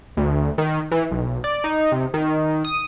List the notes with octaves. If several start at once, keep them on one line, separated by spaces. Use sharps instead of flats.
D2
D#3
E3
B1
D5
D#4
C3
D#3
D#6